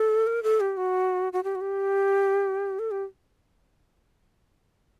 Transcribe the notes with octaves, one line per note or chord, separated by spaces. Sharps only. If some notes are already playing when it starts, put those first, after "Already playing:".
Already playing: A4
A#4
A4
G4
F#4
F#4
G4
F#4
G4
A4
G4